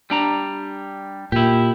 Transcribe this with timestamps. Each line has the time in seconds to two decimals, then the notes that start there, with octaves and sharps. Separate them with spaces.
0.10 G3 D4 A#5
1.32 A#2 E4 G4